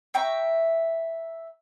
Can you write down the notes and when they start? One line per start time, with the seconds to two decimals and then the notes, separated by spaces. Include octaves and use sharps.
0.14 E5 G5 A#5 C#6